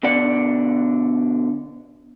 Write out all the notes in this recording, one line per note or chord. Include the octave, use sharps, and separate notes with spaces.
B2 D3 D5 F#5